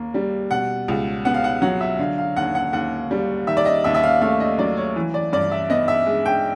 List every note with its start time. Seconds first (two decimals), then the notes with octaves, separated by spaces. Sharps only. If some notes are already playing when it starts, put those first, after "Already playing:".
Already playing: D#2 A#3
0.14 G3
0.51 B2 F#5
0.88 C#2
1.25 B3 F#5
1.34 F5
1.44 F#5
1.62 F#3 F#5
1.81 E5
1.99 D3 F5
2.18 F5
2.36 D#2 F#5
2.55 F#5
2.73 D#2 F#5
3.11 G3
3.47 D#3 E5
3.57 D5
3.65 D#5
3.84 D#2 E5
3.94 E5
4.03 F5
4.21 A3 F5
4.40 D#5
4.58 F#3 D5
4.77 C#5
4.96 E3
5.14 D5
5.32 G2 D5
5.52 E5
5.70 B3 D#5
5.88 E5
6.06 G#3
6.26 G5